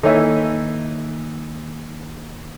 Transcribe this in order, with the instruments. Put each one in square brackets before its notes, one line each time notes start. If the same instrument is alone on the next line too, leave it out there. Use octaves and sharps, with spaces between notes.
[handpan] D#3 A#3 [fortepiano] E3 D#4 [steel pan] A4 C#5 E5